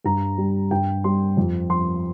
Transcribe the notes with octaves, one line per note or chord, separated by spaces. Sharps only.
G2 A#5
G3
G2 G5
G3 C6
F2
F3 C6